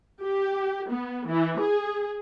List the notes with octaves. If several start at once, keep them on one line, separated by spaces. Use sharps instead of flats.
G4
B3
E3
G#4